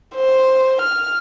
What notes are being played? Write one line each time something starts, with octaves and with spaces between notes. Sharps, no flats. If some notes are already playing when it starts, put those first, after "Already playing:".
C5
F6